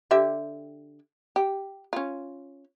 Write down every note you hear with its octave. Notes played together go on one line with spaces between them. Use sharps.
D3 G4 E5
G4
C#4 F4